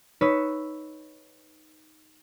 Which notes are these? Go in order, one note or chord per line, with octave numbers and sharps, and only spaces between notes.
D#4 B4 C#5 E6 B6